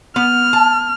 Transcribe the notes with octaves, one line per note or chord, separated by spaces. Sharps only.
B3 F6
A5